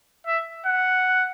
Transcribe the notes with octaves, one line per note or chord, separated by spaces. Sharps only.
E5
F#5